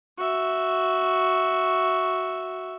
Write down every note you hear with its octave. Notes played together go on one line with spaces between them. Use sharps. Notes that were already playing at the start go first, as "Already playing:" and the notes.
F#4 E5